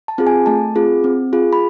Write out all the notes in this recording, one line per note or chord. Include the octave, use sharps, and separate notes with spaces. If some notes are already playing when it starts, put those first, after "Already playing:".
A5
C4 F4 G#4
G#5
A3 A5
C4 F4 G#4
C4
F4 G#4
B5